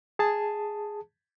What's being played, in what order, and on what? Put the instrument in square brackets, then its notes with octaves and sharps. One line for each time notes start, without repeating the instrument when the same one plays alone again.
[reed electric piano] G#4 A5